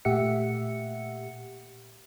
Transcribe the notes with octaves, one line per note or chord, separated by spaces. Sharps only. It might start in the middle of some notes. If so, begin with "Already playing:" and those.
A#2 A3 G4 E5 F#5 C#7